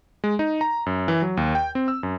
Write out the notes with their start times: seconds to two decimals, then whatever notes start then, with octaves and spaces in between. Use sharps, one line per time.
0.24 G#3
0.39 D#4
0.61 A#5
0.86 F#2
1.08 E3
1.22 F#3
1.37 D#2
1.55 G5
1.75 C4
1.88 E6
2.03 F#2